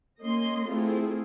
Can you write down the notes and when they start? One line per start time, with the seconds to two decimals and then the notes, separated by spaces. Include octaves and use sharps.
0.23 A#3 C#4 D#5 C6
0.68 A3 C4 E4 F4 G#4